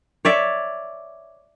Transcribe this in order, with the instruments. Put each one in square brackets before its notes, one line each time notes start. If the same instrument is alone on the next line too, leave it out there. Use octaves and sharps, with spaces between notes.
[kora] C#5 D5 E5